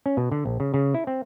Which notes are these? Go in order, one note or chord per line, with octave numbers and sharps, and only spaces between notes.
C#4
B2
D3
A#1
C#3
C#3
E4
C4